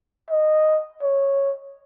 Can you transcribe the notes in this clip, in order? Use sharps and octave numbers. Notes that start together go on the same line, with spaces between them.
D#5
C#5